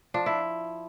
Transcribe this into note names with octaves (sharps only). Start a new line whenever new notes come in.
F3 D4
E4